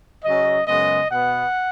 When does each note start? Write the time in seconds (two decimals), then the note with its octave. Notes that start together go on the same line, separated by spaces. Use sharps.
0.24 C#3 F#3 C#4 D#5
0.67 F#2 C#3 G#3 B3 D#5
1.09 B2 B3 F#5